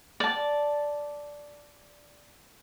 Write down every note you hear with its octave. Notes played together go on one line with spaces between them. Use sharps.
D5 A5